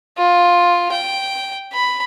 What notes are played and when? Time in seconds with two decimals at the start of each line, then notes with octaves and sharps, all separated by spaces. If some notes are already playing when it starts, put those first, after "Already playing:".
0.18 F4
0.92 G5
1.73 B5